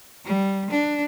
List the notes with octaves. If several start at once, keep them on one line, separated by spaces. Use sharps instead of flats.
G3
D4